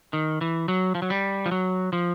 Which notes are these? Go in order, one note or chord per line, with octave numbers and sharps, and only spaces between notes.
D#3
E3
F#3
F3
F#3
G3
F3
F#3
F3